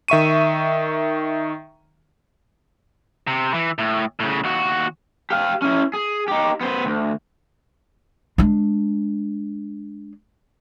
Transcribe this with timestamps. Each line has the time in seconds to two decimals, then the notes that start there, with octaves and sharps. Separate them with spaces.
0.08 D#3 E5 C#6 D#7
3.27 C3
3.54 E3
3.78 A2
4.20 A2 C#3
4.44 D#2 F#4
5.30 G4 F5
5.62 C#4 E4
5.94 G#4
6.28 D#4 G4
6.61 B3 C5
6.86 D2
8.38 G#3 D4